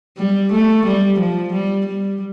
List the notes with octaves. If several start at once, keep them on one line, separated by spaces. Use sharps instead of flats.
G3
A3
G3
F3
G3
G3